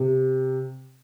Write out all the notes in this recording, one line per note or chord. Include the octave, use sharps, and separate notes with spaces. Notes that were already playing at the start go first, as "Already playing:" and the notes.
Already playing: C3